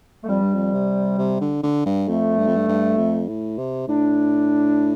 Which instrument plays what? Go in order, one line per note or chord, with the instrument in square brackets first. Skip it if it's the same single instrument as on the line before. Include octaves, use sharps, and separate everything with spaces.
[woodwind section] A3
[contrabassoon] F2 [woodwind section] G3
[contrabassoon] G2
F2
C3
C3
D3
D3
G2
[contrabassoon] F2 [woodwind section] A3
[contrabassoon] G2
F2
G2
G2
F2
A2
C3
[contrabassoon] A2 [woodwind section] D4